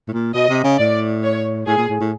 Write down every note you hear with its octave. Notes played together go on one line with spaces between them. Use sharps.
A2
A#2
B2 D#5
C3
C#3
A2 D5
C#5
A2 G#4
A#2
A2
A2